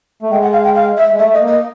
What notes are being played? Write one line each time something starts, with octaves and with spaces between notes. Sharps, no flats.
A3
G#3 G5
F#5
F5
G5
F5
E5
G#3
A3 E5
D#5
A#3
D#5